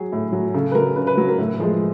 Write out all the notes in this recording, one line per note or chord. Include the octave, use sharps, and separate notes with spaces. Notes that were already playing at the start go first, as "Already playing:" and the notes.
Already playing: F#3 G#4
A2
F#3
C#3 A4
B4
F#3 A#4
C#3 B4
B4
F#3
A#4
A2
F3 G#3 G#4